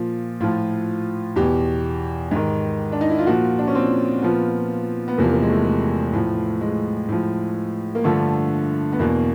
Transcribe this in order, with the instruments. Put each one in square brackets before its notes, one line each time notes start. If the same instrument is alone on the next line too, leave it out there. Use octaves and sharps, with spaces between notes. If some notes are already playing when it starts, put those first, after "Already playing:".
Already playing: [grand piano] A#2 F3
A2 F3 F4
E2 B2 G4
G#2 D#3
D4
D#4
E4
F4
A#2 F3 F#4
D4
C#4
C4
A#2 F3 B3
B3
E2 C3 F3 A#3
A#3
G#3
A3
A3
A2 F3
G#3
A2 F3
A#3
G2 D3 F3 A3
B3
E2 B2 A#3